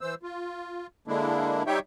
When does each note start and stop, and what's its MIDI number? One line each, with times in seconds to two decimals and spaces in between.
0.01 0.14 52
0.01 0.14 72
0.01 0.14 88
0.23 0.87 65
1.08 1.63 50
1.08 1.63 56
1.08 1.63 58
1.08 1.63 62
1.08 1.63 64
1.67 1.79 55
1.67 1.79 63
1.67 1.79 67
1.67 1.79 73
1.67 1.79 76
1.67 1.79 79